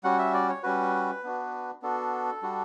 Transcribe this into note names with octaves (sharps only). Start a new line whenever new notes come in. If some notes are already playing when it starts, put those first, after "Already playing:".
G3 C#4 F#4 F#5
E5
D5
C#5
G3 C#4 F#4 B4
B3 D4 F#4
B3 D4 F#4 A4
G3 D4 F#4